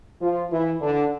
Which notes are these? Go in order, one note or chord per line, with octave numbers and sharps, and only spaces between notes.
F3 F4
E3 E4
D3 D4